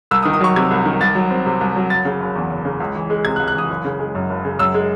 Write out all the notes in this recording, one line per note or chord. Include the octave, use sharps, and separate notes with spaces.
C2 E6
D#6
D#3
D#6
F#3 C#6
C3 G#6
C2
D#3
C2 A6
F#3
C4
C3
C2
F#3
F#1 A6
C#3
F#1
E2
F#1
C#3
C#2
E3
G#3
C3 G#6
F#6
C#2
F#6
E3 D#6
F#1
C#3
G#3
F#2
F#1
C#3
F#2 E6
G#3